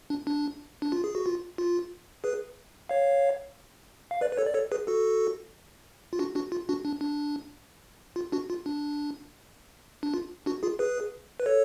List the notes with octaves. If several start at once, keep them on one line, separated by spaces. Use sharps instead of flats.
D4
D4
D4
F4
G#4
F#4
F4
F4
G#4 B4
C#5 F5
F5
B4 D5
B4
A4 C#5
D5
A4 C#5
G#4 B4
F#4 A4
F4
D4 F#4
D4 F#4
F4
D4 F#4
D4
D4
F4
D4 F#4
F4
D4
D4
F4
D4 F#4
F4 G#4
G#4 B4
B4
A4 C#5